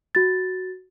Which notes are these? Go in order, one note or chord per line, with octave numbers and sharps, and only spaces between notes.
F#4 A6